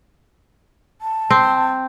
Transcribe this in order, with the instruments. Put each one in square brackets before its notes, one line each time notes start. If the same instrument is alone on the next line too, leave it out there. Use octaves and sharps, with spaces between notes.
[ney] A5
[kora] C4